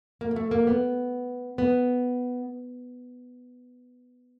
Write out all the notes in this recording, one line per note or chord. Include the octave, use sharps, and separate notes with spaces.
A#3
A#3
A3
A#3
B3
B3